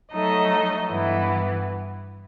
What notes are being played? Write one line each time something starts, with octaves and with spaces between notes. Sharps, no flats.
F#3 A3 D#4 A4 D#5
G2 E3 B3 E4